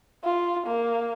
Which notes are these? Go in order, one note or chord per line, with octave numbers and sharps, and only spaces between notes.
F4
A#3